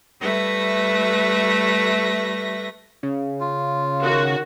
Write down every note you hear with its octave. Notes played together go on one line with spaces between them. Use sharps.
G3 A3 B4 E5 A#6
C#3
F4
D#3 F#4